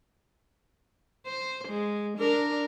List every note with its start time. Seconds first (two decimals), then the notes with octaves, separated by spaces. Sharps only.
1.26 C5
1.68 G#3
2.18 D4 A#4